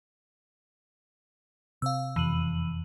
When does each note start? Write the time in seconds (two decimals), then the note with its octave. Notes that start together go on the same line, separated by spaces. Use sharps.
1.82 C3 C4 F5 E6
2.16 E1 F2 C3 E3 D#7 F#7